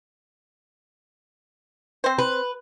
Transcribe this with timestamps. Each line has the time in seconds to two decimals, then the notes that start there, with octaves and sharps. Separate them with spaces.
2.04 C4 C5
2.18 B4